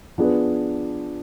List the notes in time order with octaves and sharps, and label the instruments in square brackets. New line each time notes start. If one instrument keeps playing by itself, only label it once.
[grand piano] F3 B3 D4 G#4 B4